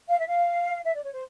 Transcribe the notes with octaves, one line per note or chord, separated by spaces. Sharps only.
F5
E5
F5
E5
D5
C#5
C5